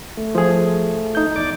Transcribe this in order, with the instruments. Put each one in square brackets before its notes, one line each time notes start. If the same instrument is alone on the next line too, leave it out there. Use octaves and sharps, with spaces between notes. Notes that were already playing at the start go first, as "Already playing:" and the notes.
[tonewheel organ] A3
[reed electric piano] F3 G#4
D#4 G6
[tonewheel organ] E2 D5 D6